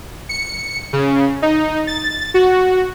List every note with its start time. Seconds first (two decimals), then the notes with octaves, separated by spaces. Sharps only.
0.29 C#7
0.93 C#3
1.42 D#4
1.87 A6
2.34 F#4